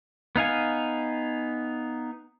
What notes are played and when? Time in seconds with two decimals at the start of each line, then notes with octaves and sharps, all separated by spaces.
0.36 B3 D#4 F5 G#5